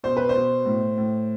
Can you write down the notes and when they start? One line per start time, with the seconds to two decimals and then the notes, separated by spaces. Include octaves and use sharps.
0.04 B2 C5
0.17 B4
0.29 C5
0.35 B2
0.66 A2
0.98 A2